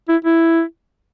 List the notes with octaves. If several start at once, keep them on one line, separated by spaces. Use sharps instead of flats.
E4
E4